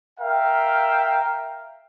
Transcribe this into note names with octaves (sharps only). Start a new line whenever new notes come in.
A#4 E5 F5 G5